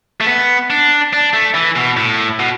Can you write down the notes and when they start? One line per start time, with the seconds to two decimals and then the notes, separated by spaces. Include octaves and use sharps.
0.21 A3
0.27 B3
0.70 D4
1.13 D4
1.33 A3
1.55 E3
1.76 B2
1.97 A2
2.39 B2